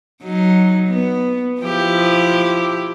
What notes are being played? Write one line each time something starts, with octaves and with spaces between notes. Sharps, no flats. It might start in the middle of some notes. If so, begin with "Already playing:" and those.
F#3 D#4
B3
F3 E4 G4